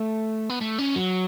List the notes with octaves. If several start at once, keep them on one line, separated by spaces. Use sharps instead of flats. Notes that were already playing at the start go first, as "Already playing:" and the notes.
Already playing: A3
B3
A3
C#4
F#3